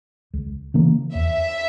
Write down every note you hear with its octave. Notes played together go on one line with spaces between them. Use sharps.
C#2
C#3 E3 A#3
E2 E5